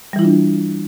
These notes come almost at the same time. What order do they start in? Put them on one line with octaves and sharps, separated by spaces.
G3 E3 E4 F4 D4